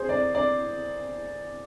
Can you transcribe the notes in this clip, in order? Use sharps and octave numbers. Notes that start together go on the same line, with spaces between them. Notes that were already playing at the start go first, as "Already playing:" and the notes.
Already playing: G#4 C5
D5
D5